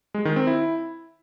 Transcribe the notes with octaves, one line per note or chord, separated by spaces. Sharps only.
G#3
D#3
C4
E4